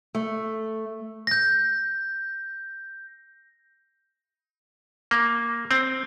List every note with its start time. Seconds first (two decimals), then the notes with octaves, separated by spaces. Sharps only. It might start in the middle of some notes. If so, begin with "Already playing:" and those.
0.15 A3
1.27 G6 A#6
5.11 A#3
5.71 C4